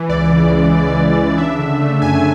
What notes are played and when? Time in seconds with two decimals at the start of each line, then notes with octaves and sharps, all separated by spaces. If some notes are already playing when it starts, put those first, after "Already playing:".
Already playing: E3
0.09 C#2 D5
0.31 C#3
0.52 G#3
0.74 C#2
0.95 C#2
1.17 C#3
1.38 D4 E5
1.59 D3
1.81 A3
2.02 F#2 G#5